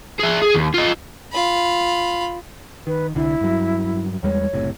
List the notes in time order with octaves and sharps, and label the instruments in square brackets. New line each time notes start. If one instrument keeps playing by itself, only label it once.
[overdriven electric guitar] G#4 E5
G#4
D#2
F4 D#5
[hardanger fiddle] F4 B5
[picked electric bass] D#3 [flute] B4
[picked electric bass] C2 D3 [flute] E4
[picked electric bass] G2 F#3
[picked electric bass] E2 G3 G#3 [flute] C#5
[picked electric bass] F#1 A2 C3